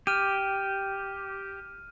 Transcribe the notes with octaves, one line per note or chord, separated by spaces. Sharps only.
G4 F6 D#7